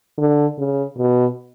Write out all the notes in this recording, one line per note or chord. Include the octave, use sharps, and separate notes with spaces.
D3
C#3
B2